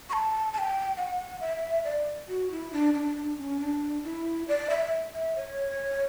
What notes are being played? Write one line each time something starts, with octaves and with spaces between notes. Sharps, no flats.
C#6
A5
A5
G5
F#5
E5
D5
F#4
E4
D4
D4
D4
C#4
D4
E4
D5
E5
E5
C#5